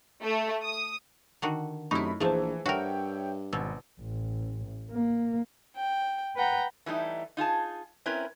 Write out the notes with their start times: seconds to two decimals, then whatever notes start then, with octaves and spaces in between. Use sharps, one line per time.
0.23 A3
0.64 D#6
1.42 D3 D#3 F#4
1.91 F#2 C3 A3 D#4 E4 B5 C#6
2.20 A#1 E3 F3 A3 G#4 C5
2.66 G2 F#4 A#4 C#5 E5 G5
3.53 G#1 B2 E6
4.01 A1
4.92 A#3
5.76 G5
6.36 B4 F#5 G5 A#5
6.86 E3 G3 A3 D#4
7.37 D#4 F4 G#4 A5
8.06 C4 C#4 E4 A#4 B4